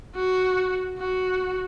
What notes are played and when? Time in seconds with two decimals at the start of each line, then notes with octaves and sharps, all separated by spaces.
0.16 F#4
0.98 F#4